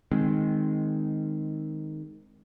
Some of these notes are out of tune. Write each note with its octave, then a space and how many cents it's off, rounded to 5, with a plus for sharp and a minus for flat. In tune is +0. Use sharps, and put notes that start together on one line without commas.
D#3 +0 G#3 +5 C4 +0